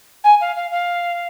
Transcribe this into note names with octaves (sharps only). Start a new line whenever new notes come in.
G#5
F5
F5
F5